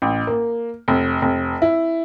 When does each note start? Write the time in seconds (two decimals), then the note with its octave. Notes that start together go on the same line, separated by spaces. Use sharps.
0.02 A1
0.27 A#3
0.88 F1
1.22 F1
1.62 E4